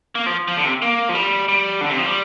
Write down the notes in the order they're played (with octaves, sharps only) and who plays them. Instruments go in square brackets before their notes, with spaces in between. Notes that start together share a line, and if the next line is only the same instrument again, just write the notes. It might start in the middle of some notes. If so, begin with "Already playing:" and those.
[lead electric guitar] A#3
F3
F3
D3
C3
A#3
F3
G3
G3
D3
C3
F3
G3